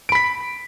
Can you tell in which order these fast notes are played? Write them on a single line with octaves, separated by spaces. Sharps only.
D7 B5 B6